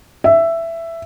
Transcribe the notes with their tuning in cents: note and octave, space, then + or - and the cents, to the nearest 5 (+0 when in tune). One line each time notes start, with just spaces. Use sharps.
E5 +10